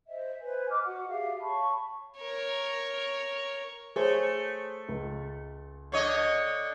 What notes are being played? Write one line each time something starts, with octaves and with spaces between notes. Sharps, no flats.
C5 D#5 E5
B4 C5 G#5
D#5 D6 F6
F#4 F#5
G4 G#4 E5 F5
C#5 A5 B5 C#6
A#4 C#5
A3 G#4 C5 C#5
C#2
D3 C#5 D#5